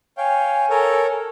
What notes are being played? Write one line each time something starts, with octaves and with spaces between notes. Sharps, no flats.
C#5 F5 G5 G#5
A4 A#4 C#5